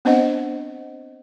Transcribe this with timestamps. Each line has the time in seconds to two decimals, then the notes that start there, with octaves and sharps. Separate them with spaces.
0.05 B3 C4 D4 C5 D#5 F#5